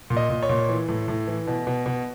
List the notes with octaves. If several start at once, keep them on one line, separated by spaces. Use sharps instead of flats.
A#2
D#5
A#2
C#5
A#2
E3
A2
A2
E3
B2
B2
B2